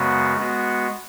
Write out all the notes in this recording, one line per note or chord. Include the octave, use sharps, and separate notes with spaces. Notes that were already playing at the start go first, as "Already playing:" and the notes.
Already playing: F#2 C#3 G#3 B3 F#4
G#3 B3 F#4